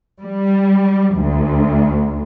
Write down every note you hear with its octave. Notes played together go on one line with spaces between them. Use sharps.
G3
D2